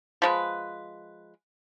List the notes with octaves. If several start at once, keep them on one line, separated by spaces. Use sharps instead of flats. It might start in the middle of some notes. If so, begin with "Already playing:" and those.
F3 G#3 B4